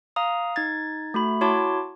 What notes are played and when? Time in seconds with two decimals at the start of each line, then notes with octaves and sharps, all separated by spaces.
0.16 F5 A#5 D#6
0.56 D#4 G#6 A6
1.14 A3 F#4 B5
1.41 E4 F#4 C#5 A5 C6 D6